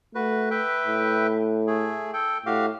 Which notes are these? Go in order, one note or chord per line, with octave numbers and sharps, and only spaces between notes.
A3 F#4 B4
B4 E5 G5
A2
A3 G#4
A4 G5
A2 F#4 G4 F5